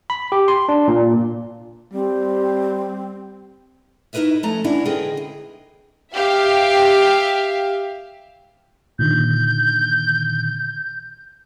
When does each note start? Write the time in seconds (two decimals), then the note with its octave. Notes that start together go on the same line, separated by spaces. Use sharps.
0.10 B5
0.32 G4
0.48 C6
0.69 D4
0.88 A#2
1.93 G3 C4
4.13 D#4 E4 A#4 B4 D#5 E5
4.43 F3 A3 C#4 A#5
4.64 D2 E3 C#4 D4 E4 F#4
4.85 D3 G#4 A#4 B4 D#5 G5
5.17 C3
6.15 G4 E5 F5
8.99 A#2 D3 D#3 G6